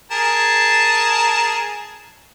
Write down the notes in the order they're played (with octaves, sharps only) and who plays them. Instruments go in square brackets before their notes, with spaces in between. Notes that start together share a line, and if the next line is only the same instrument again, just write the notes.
[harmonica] G#4 A#4 A5